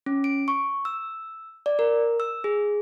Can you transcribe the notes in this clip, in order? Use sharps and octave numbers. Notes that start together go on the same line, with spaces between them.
C#4
D7
C#6
E6
D5
A#4
E6
G#4